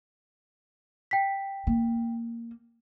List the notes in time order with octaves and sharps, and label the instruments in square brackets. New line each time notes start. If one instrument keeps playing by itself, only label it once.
[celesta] G5 B6
[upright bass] A#3